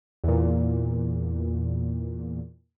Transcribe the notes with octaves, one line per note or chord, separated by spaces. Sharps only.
E2 A#2